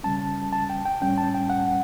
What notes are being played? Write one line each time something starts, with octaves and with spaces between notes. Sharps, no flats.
C#3 G3 C#4 A5
A5
G5
G5
A2 G3 C#4 G5
A5
G5
F#5